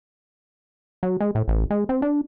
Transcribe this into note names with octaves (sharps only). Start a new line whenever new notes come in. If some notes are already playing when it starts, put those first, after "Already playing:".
F#3
G#3
A2
A1
G#3
C4
D4